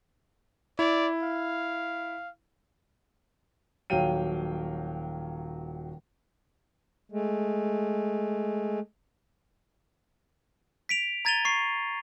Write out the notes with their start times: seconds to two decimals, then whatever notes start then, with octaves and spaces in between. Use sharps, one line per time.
0.79 E4 D5
1.23 F5
3.90 D#1 F#3 F5 G5 D#7
7.12 G#3 A3
10.89 B6 D7 F7
11.25 A#5 G#6 A6 D#7 F7 G7
11.45 C#6 C7